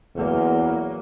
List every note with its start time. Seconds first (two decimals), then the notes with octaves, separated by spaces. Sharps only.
0.16 E2 F#3 A#3